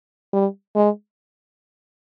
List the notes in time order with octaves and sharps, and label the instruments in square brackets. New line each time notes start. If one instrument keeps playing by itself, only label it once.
[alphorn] G3
G#3